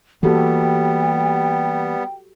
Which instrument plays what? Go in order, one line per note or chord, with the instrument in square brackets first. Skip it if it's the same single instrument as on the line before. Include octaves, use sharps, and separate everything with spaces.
[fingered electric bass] E3 A#3 [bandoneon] G3 B3 [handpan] F#4 G4 A4 [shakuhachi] G5